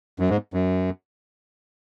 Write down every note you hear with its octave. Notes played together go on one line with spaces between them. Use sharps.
F#2
G#2
F#2